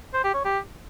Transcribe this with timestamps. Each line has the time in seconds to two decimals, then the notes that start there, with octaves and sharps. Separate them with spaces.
0.13 C5
0.24 G4
0.34 C#5
0.44 G4